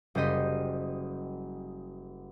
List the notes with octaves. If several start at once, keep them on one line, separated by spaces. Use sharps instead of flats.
F#1 G3 C5 D#5 B6